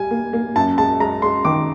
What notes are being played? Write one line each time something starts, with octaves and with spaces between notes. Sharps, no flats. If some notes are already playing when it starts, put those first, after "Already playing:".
Already playing: G3 G#5
A#3
A#3
F#2 A5
G#3 A5
G#3 A#5
G#3 C6
D#3 D6